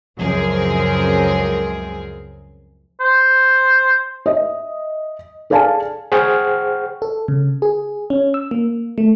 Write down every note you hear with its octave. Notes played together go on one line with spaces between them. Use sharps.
C#2 F#2 F3 C4 G#4 A#4
C5
D#5 E5
G#4 A4 D5 F5 G#5 A5
G#4 C5 F#5 G5 C#6 F6
A4
C#3
G#4
C#4
E6
A#3
A3